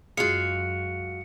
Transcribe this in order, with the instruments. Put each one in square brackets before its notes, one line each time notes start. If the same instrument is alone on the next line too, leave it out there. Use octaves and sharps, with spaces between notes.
[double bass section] F#2 [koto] G#3 F4 [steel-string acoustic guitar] F#4 F5 [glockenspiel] C#7